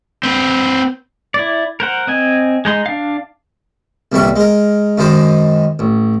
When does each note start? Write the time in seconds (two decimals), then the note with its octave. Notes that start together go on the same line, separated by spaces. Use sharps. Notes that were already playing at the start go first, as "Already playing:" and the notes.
0.23 C4 B4
1.34 E4 D5
1.80 A#4 C5 F#5
2.07 C4 D#5 G#5
2.65 G#3 D#4 C6
2.86 D4 F5
4.12 C2 F2 A#2 E3 G3 C#6
4.36 G#3 A#4
4.98 F#2 D#3 G#3 D#4 C5
5.79 A1